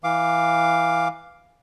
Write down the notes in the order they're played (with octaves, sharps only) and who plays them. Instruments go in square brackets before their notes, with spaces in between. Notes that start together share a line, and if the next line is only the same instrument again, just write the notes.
[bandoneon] E3 F5 D6